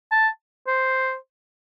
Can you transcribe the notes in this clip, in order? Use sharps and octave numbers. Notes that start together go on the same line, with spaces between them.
A5
C5